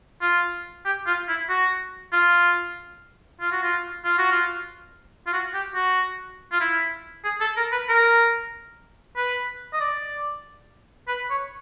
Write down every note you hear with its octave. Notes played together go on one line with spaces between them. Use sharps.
F4
G4
F4
E4
F#4
F4
F4
F#4
F4
F4
F#4
F4
F4
F#4
G4
F#4
F4
E4
G#4
A4
A#4
B4
A#4
B4
D#5
D5
B4
C#5